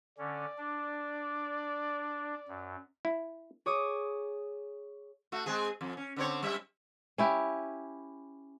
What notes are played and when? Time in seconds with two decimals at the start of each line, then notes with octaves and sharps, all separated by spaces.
0.18 D3 C#4 D5
0.58 D4
2.48 F#2
3.05 E4
3.66 G#4 C#5 D6 D#6
5.32 A3 F#4
5.46 G#3 C4 G#4
5.81 F2
5.97 C#4
6.16 D3 C4 C#5
6.43 G3 E5
7.18 C#4 E4 G4